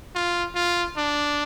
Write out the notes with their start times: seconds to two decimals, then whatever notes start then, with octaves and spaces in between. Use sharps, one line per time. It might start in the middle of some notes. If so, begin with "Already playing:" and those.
0.15 F4
0.55 F4
0.97 D4